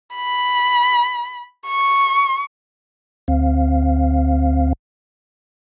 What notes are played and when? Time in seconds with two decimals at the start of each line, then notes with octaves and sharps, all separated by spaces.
0.15 B5
1.67 C#6
3.28 D2 C4 F5